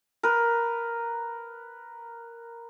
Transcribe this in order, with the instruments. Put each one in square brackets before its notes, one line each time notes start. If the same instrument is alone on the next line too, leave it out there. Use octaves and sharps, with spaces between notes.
[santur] A#4 B4